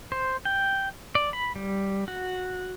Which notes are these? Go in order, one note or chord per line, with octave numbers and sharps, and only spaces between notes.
C5
G5
D5
B5
G3
F#4